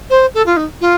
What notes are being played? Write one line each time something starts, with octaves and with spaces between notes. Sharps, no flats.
C5
A4
F4
D#4
F4